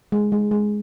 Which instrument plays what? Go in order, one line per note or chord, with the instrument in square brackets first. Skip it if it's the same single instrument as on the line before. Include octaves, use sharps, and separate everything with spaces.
[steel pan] G#3
G#3
G#3